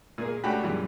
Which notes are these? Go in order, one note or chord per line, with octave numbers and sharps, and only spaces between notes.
A#2 A#3 G#4
C#2 A3 D4 F#4 G4 B5
F#2 A#2 C#3 E3 G3